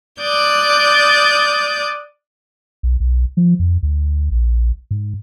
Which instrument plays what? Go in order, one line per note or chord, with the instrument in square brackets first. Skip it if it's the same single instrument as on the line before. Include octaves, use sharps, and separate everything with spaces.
[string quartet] D5 D6 D#6 F#6 G6 A6
[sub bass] B1
B1
F3
F2
D2
A#1
G#2